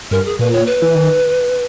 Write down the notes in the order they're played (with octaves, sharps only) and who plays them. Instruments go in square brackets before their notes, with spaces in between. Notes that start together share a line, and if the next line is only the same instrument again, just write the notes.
[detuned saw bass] G2 [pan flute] A#4
[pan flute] G#4
[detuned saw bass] A#2 [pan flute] B4
[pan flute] C#5
B4
[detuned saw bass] E3
D#3